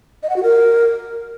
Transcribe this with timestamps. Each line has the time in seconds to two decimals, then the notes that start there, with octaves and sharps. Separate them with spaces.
0.23 D#5
0.30 F#5
0.36 F#4
0.43 A#4